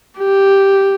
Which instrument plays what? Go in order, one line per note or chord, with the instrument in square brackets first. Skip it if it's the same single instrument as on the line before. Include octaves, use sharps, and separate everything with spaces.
[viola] G4